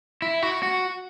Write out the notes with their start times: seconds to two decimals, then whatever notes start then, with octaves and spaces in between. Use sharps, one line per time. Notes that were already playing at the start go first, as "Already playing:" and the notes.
0.22 E4
0.42 F#4
0.63 F#4